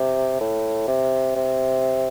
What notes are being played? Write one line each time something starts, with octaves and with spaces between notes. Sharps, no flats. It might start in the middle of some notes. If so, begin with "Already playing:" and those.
Already playing: C3
A2
C3
C3